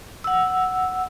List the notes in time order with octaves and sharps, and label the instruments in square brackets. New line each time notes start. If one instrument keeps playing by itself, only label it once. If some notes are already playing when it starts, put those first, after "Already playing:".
[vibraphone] F#5 E6